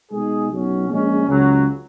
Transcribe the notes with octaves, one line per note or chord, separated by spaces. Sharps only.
B2 G#3 D#4 G#4
B1 B2 F#3 C#4
A#1 A#2 G#3 C#4
C#2 C#3 F#3